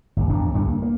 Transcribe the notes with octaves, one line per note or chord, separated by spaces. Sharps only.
G1 D#2
E1 F2 G#2 D4
C2 G2 D3 D4
A#3
A#3